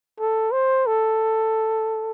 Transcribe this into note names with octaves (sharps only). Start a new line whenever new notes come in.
A4
C5
A4